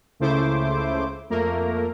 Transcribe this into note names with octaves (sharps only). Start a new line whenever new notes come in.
C#2 C#3 A3 E4 C5 D6
F2 A3 A#3 A#4